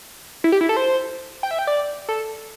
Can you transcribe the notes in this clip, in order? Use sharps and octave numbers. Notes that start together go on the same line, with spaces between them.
E4
G4
E4
A4
C5
G5
E5
G5
D5
A4